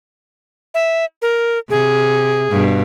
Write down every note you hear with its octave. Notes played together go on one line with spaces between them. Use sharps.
E5
A#4
C3 G#4
G2 B2